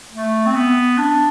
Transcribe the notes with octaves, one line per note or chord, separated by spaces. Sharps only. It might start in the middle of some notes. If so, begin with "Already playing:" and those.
A3
C4
B3
D4